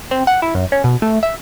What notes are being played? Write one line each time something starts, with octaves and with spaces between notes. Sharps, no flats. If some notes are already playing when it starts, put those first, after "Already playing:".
C4
F#5
E4
F#2
C#4
B2
A3
E5